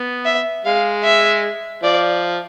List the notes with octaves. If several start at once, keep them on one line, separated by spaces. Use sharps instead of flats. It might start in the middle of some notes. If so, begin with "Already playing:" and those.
Already playing: B3
E5
G#3 F5
E5
F3 D5